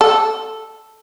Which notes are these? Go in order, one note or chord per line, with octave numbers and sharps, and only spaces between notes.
A4